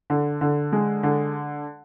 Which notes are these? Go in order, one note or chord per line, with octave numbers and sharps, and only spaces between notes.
D3
D3
G#3
D3